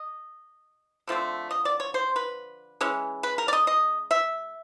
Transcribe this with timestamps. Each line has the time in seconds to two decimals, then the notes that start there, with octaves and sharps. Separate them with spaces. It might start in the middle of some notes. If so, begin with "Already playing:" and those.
Already playing: D#5
1.07 D3 F3 A3 C4
1.51 D#5
1.65 D5
1.80 C#5
1.94 C5
2.16 B4
2.81 E3 G#3 C#4
3.23 B4
3.38 A#4
3.48 D5
3.53 D#5
3.67 D#5
4.11 E5